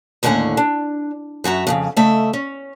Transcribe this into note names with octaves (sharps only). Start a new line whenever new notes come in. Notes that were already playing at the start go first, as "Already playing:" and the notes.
D#2 A2 D3 C#4 F#5 G#5
D4
F#2 F#4 E5 A#5
F2 A2 C#3
C#3 A3 D#5 E5
C#4